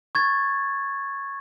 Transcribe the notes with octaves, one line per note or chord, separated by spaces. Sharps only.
C#6 G#6 A6